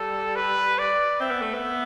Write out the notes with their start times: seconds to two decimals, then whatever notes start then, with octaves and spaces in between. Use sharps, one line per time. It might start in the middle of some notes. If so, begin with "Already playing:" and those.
Already playing: G3 A4
0.36 B4
0.79 D5
1.20 C4 E5
1.31 B3
1.42 A3
1.54 B3